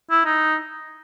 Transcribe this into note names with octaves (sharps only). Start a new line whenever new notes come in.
E4
D#4